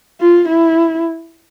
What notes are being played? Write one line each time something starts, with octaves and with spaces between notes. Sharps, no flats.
F4
E4